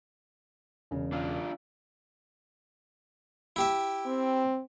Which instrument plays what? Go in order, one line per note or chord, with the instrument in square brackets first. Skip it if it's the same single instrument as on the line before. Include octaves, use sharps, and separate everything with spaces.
[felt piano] E1 C#3
[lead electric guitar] D4 F4
[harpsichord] E4 G4 E5
[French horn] C4